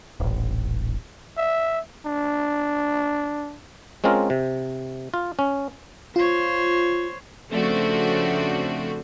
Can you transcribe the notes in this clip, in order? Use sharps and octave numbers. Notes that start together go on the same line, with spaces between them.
D#1 A1
E5
D4
G#3 C4 C#4 F4 A#4
C3
F4
C#4
F4 C5 C#5
C#3 F3 A3 C4 D4 F#4